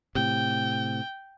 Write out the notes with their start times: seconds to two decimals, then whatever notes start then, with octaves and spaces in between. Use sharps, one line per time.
0.15 A2 C3 G5